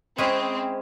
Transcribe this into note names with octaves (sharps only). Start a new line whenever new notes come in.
G#3 C4 C#4 E4 G#4